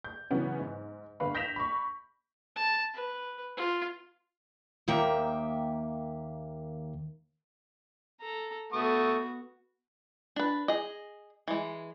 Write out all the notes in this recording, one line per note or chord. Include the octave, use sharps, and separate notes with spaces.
G6
C#3 E3 F#3 B3 C#4
G#2
G1 B4 F5 B5
G6 A#6 B6 E7 F7
B5 C#6
A5
B4
F4
D#2 D#3 A#3 E5 G5
A4 A#5
A3 B3 F#4 C#6 D#6
D4 B4
G#4 D#5
E3 G#3